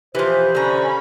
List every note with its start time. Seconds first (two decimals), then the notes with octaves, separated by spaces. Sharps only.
0.15 E3 F3 G4 C5 F#6 B6
0.55 D3 C#4 A#5 B5